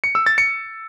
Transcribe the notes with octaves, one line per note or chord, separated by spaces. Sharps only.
C#7
E6
A6
C#7